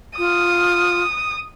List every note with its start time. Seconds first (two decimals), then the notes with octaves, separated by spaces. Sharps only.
0.18 F4 D#6